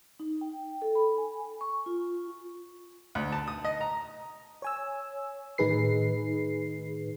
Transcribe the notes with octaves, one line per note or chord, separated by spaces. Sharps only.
D#4
G5
A4
B5
G#5
C#6
F4
D2
A5
D#6
D#5
A#5
C#5 G#5 E6
A2 D#3 D#4 G#4 B4 C7